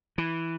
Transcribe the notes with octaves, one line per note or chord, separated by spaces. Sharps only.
E3